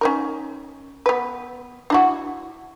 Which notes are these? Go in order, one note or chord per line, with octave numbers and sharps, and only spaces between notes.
C#4 D#4 A#4
B3 B4
D4 E4 F#4